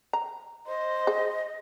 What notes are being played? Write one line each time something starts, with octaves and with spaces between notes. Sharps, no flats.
A#5
C5 D#5
G#4